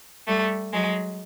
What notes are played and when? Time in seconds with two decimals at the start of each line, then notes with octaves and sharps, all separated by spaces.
0.27 G3 A3
0.73 F#3 G#3